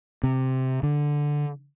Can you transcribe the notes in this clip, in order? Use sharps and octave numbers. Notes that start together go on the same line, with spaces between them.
C3
D3